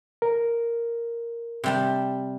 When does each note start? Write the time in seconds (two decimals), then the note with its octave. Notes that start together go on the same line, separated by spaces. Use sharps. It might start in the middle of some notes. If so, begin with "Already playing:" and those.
0.22 A#4
1.64 C3 G3 A5